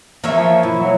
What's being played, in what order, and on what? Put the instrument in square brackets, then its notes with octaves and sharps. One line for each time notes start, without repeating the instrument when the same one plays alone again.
[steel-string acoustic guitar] E3 E4 F4 [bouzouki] A#3 C#5 E5
[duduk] F3
[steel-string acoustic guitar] B2 [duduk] E4
[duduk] F#3